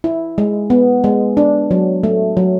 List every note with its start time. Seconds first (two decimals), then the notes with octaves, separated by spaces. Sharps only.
0.04 E4
0.38 G#3
0.70 B3
1.04 G#3
1.37 D4
1.71 F#3
2.03 A3
2.37 F#3